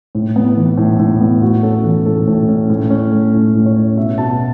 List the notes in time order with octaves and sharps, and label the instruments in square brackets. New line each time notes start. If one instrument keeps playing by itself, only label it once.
[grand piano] A2
B3
E3
A2
A2
B3
A2 F#4
C#4 A4
E3 F#4
A2 A4
A2
C#4
A2
C#4
A3
A2
A2
C#5
C#4
B2 E5
B2 A5